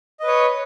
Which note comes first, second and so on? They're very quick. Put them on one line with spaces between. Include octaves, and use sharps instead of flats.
D#5 B4 C#5